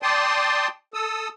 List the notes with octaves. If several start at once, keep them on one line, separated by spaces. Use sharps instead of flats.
D5 G5 A5 C6 D#6
A4 D#6 E6